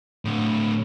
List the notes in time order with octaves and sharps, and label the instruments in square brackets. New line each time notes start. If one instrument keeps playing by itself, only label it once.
[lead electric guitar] A2 D3